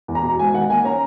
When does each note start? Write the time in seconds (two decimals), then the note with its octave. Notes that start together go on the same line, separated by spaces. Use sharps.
0.08 E2
0.15 A#5
0.23 B2
0.39 G#2 G#5
0.54 D#3 F#5
0.69 A#3 G#5
0.84 C#4 A#5